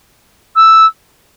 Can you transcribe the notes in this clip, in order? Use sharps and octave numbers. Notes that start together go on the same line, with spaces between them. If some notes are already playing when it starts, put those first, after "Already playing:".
E6